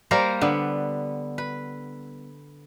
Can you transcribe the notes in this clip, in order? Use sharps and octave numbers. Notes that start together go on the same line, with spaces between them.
G3 A#3 A#4 C5
D3 B3
B4